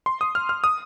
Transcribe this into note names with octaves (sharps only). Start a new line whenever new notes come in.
C6
D#6
F6
F6
D#6